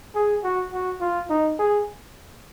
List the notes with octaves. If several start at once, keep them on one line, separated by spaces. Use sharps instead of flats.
G#4
F#4
F#4
F4
D#4
G#4